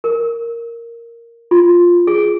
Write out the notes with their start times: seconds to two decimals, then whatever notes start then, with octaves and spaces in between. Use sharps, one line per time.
0.04 A#4
1.51 F4
2.07 G#4